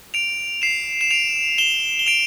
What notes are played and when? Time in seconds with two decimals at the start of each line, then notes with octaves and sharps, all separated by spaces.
0.14 D7 F7
0.62 C7 E7
1.01 E7
1.11 D7 F7
1.58 E7 G7
1.99 G7
2.06 D7 F7